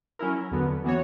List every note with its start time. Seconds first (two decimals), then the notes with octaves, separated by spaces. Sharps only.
0.19 F#3 C#4 E4 A#4
0.51 E2 D3 F#3 B3
0.84 E3 B3 F#4 C#5